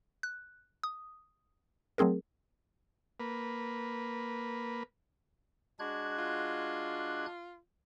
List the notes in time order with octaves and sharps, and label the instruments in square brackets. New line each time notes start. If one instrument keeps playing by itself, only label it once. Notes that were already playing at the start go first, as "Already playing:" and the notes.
[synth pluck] F#6
D#6
F#3 A3 C4 G#4 A#4
[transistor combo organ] A#3 B4
[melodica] G#3 F#4 [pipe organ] D4 F#6 G#6
[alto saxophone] F4